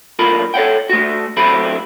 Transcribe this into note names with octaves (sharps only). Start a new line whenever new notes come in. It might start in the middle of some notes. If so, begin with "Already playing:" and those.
B1 A2 F4 A#4 B5
A4 C#5 F#5 G5
A3 F#4
F#3 A3 C4 E4 G4 B5